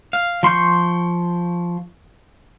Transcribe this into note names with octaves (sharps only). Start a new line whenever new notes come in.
F5
F3 C6 C#6 G6